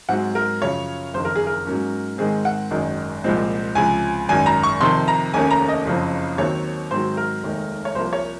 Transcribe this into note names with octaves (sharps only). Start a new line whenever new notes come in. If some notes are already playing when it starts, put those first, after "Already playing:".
G#2 F#3 C4 F#5
A#4
F#2 C#3 F3 C#5
F#1 F2 D#3 C5
A#4
G#4
A#4
G#2 F#3 A#3 C#4
G#2 D#3 G#3 C4 G#4
F#5
G#1 F#2 D#3 G#3
C2 A#2 F3 G#3 C4
C#2 C3 F3 G#5
G#1 F#2 D#3 G#5
A#5
C#6
F2 C3 D#3 C6
A#5
F1 D#2 D#3 A#3 C#4 G#5
A#5
D#5
F#1 F2 C#3 F3 C4
D#2 D#3 F#3 C4 C#5
G#2 D#3 F#3 C4 C5
A#4
F1 D#2 D#3 G#3
C#5
C2 C3 F3 A#3 C5
C#5